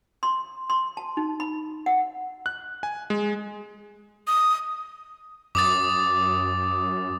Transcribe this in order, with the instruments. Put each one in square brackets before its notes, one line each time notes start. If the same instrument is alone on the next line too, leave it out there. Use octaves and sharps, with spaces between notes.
[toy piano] C6
C6
A5
D#4
B5
F#5
[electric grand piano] F#6
G#5
G#3
[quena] D#6
[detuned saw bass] F#2 [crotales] D6 D#6 A6